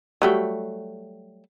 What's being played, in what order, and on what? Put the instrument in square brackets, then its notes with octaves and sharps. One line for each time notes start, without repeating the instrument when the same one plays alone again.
[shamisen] F#3 G3 A3